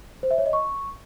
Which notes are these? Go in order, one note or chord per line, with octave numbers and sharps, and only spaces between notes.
C5
E5
C#5
D#5
C#6